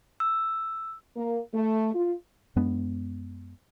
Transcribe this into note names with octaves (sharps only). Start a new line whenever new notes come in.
E6
A#3
A3
F4
F#2 G#3 B3 D4